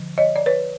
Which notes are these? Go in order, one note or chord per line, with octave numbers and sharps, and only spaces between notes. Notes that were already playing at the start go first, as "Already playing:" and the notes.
Already playing: D3 F3
C#5 D#5
D5
B4 C#5